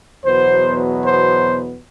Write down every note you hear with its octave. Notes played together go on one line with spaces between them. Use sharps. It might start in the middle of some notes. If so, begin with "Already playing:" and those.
E2 B2 F#3 B3 C5
C5